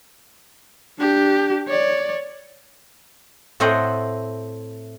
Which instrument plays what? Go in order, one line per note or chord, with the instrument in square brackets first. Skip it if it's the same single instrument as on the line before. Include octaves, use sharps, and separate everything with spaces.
[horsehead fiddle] D4 G4
C#5 D5
[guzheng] A2 A3 C4 C5 D#5 F#5